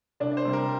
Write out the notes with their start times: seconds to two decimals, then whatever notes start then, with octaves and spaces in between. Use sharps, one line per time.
0.20 C2 D4 D5
0.32 D5
0.37 C5
0.45 C3 G3
0.53 A#4